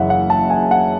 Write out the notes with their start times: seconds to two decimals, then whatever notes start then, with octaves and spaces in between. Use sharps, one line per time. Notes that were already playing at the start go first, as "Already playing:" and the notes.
Already playing: F#1 F#2 C#3 E3 E5 F#5
0.10 F#5
0.30 A5
0.50 G#5
0.71 F#5